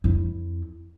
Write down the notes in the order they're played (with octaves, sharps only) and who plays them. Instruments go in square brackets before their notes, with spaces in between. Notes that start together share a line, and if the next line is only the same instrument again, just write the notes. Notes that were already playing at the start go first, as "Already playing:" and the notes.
[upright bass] F2 E4